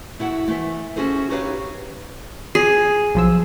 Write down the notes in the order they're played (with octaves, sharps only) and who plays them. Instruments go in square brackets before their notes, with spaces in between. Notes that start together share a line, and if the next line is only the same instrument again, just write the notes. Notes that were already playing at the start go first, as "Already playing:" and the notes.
[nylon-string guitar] A3 E4 F#4 F#5
E3 A3
C#4 F#4 G#4 A4 C5
D#4 F#4 G4 B4 C#5 F5
[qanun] G#4 [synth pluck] C7
[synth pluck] B1 F3 E6